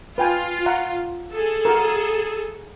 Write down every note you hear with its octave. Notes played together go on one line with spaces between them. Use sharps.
F4 B4 G5 G#5
F5 F#5 A#5
G#4 A4
F#4 A#4